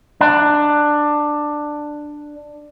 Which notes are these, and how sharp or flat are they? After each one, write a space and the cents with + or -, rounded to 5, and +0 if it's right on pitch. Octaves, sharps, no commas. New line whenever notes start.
D4 +10